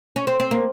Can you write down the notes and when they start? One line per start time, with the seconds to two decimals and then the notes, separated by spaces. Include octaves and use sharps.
0.16 C#4
0.27 C4
0.40 C4
0.51 A#3